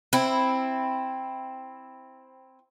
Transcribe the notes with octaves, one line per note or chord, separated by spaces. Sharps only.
C4 E4